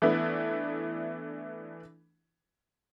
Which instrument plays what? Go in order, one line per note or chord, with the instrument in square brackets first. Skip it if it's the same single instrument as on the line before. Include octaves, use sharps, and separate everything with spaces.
[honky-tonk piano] E3 A3 B3 D4 E4